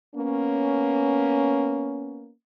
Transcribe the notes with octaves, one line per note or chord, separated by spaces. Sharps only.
A#3 B3 C#4